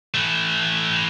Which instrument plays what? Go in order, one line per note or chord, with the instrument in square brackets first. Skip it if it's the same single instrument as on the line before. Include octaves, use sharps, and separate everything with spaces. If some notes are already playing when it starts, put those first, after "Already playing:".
[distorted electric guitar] E3 A3